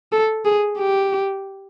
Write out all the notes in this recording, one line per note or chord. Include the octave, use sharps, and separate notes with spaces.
A4
G#4
G4